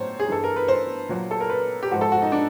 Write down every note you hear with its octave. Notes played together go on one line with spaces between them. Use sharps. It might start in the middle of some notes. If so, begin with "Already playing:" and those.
Already playing: A2 F#3 C5 C#5
G#4
G2 E3 A4
A#4
B4
C5
A#2 F#3
A4
A#4
B4
G4
G#2 F3 F#4
A4
F#4
D#4
D4